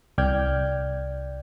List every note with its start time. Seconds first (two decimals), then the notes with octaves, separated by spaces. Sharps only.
0.18 C2 D5 G5 F6 G6 G#6